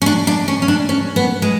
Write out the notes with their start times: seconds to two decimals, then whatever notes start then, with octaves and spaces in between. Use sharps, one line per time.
0.02 C#4
0.06 D4
0.27 D4
0.48 C#4
0.62 C#4
0.68 D4
0.89 C#4
1.16 B3
1.42 G#3